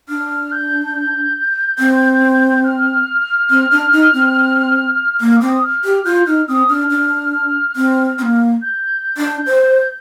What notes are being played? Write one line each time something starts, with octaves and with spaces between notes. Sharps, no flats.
D4 F6
G6
G6
C4
F6
C4
D4
D#4
C4
A#3 F6
C4 D6
D#6
F6
G4
F4 G6
D#4 F6
C4 D#6
D4 F6
D4
C4
C4
A#3
G6
D4
C5